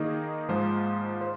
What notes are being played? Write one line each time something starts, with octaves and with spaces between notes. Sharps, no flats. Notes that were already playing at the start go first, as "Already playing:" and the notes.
Already playing: D#3 A#3 D#4 G#4 D#5
G#2 F3 G#3 F4 C5
C5